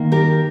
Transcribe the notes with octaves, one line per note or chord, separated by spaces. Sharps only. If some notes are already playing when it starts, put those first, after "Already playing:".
Already playing: D#3 A#3
G4 A#4